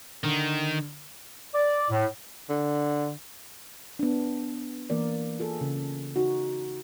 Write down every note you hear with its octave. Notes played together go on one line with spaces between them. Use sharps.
D3 D#3
D5
A2
D3
B3 D4
E3 A#3 A#4 D5
F4 G#4 A4
C#3
D#4 F#4